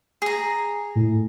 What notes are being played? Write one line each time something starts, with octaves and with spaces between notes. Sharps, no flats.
G#4 A#5
A2